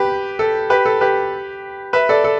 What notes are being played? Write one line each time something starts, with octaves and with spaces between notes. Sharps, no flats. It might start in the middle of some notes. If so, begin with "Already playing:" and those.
Already playing: G4 B4
A4
G4 B4
A4
G4 B4
B4 E5
A4 D5
A4